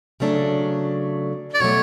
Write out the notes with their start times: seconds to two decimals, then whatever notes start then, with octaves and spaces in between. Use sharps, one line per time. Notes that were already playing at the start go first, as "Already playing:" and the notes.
0.20 C#3 F#3 A3 D4
1.54 D5
1.60 B2 F#3 A3 C#5